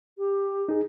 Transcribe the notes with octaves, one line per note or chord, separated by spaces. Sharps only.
G4
D#4 G#4